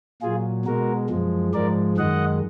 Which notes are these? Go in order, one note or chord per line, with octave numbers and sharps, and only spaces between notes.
A#2 F#3 F4 G#4
B2 G#3 F#4 A#4
F#2 F3 G#3
G#2 F3 G#3 A#4 D5
F#2 D#3 G#3 D#5 F#5